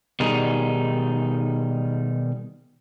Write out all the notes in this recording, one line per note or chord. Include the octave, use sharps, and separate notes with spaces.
B2 D#3 G3 D#4 G#4